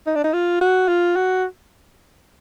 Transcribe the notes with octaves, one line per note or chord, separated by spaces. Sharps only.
D#4
D4
D#4
F4
F#4
F4
F#4